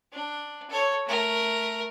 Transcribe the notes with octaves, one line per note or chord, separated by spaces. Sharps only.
D4
A4 C#5
A3 A#4